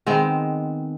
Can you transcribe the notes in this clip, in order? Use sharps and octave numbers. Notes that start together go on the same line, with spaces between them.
D#3 G#3 B3 C4